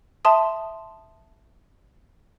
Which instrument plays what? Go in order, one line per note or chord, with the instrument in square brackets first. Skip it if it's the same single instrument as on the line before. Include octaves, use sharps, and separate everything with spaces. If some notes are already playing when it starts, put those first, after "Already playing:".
[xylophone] E5 A5 C6 D#6